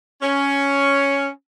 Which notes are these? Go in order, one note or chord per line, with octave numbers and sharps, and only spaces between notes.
C#4